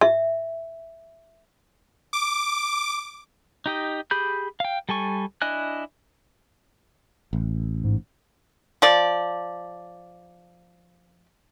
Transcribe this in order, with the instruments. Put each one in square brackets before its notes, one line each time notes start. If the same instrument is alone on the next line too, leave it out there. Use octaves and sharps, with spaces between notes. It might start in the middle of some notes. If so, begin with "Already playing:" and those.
[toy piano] E5
[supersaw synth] D6
[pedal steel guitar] D#4 G4 D#5
G4 G#4 B5 G6
F5 G5
G3 A4 G#5 C#6
D4 E4 D#5 G#5 F#6
[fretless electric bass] A1
[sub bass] G#2
[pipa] F3 D5